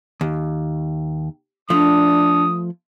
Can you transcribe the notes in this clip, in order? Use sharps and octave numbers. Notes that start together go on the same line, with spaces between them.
D#2
F3 A3 D4 D#6